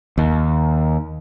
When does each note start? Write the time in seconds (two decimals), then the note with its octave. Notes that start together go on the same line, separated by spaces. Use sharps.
0.18 D#2